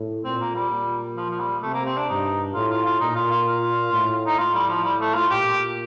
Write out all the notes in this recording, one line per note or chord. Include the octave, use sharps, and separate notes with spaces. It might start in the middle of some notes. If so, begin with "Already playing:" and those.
Already playing: A2
A#2 C4
A#3
G3
A#2
F3
F3
G3
C3 A3
A#3
C4
D4
G2 D#4
A2 F4
F4
F4
A#2 D#4
F4
F4
F4
A2
D#4
A2 F4
G3
F3
G3
A3
F4
A#2 G4